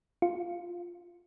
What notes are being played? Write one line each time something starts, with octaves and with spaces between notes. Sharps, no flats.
F4